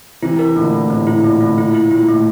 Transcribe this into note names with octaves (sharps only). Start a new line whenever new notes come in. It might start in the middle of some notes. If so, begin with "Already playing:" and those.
C3 E3 E4
A#4
E3
A#2 D3 A3
A3
A2 C3 A3
E4
A#2 D3 A3
D3 A3
C3
A#2 E4
E4
A#2 E4
A3
A2